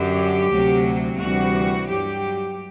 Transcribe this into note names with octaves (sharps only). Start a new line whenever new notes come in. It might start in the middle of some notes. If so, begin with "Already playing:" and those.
Already playing: F#2 D3 F#3 G4
D2 C3 F#3
D2 C3 E3 G3 F#4
G2 F#3 G4